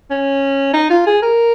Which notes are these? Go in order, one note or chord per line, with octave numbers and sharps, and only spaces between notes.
C#4
D#4
F4
G#4
A#4